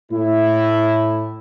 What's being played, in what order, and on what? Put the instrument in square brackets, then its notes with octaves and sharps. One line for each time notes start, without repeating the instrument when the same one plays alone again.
[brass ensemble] A2 E4